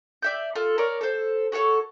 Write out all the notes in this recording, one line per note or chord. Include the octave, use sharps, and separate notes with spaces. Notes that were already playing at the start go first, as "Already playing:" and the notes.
D5 E5 G6
F4 A4
A#4 C#5 D5
A4 C5
F#4 G#4 A4 C#5